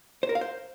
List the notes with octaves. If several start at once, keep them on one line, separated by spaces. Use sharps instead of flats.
C5
A#4
F5
C5